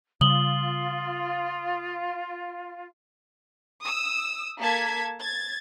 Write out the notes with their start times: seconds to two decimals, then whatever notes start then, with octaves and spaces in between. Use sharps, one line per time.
0.21 C#3 G3 F4 D#6 F#7 G7
3.83 D#6 E6
4.61 A#3 A4 A5 G#6 B6
5.21 G#6 A6